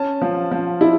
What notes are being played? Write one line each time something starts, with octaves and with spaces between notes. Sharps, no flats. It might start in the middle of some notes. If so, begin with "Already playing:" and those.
Already playing: C#4 A5
F3
F3
E4